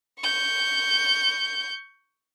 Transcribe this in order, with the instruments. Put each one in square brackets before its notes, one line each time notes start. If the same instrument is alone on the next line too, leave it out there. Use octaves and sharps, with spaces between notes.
[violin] C#6 G6